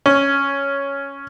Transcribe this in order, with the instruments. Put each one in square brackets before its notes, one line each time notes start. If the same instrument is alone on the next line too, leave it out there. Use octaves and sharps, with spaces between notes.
[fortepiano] C#4